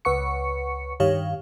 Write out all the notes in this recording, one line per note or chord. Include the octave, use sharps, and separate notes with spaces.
C#2 B4 F#5 C#6 C#7
G2 D#3 G4 C#5 F5